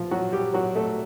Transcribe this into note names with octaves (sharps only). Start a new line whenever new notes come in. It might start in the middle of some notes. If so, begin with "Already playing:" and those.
Already playing: E2 B2 F3 F4
F#3 F#4
G3 G4
F#3 F#4
A3 A4